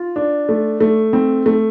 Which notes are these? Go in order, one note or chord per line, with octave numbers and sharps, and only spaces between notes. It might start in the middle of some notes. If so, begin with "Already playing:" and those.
Already playing: F4
D4
A3
A3
C4
A3